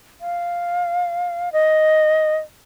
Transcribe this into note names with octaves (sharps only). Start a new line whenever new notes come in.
F5
D#5